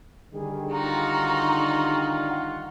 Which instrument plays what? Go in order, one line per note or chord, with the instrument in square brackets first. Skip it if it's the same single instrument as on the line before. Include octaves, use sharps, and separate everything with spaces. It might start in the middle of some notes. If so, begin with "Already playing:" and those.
[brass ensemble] D3 D#3 G3 [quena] G#4
[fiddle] D#4 F#4 [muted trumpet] F4 [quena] A#5
[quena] F#5